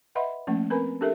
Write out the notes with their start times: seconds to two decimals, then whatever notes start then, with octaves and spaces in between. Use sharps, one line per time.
0.15 B4 D#5 E5 F#5 B5 C6
0.47 F3 A3 A#3 C#4
0.70 C4 A#4 B4 G#5 A#5 B5
1.01 D4 G4 A4 A#4 E5